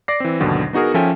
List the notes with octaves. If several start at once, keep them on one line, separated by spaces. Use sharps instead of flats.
D5 D6 A#6 C7
E3 C4
G#1 D#2 B2 D3 F#3
B3 D#4 F#4 G#4 A#4
F3 C#4 A4 E5 G5 G#5